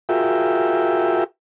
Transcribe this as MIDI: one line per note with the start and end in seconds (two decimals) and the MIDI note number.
0.09 1.24 65
0.09 1.24 66
0.09 1.24 68
0.09 1.24 70
0.09 1.24 76
0.09 1.24 79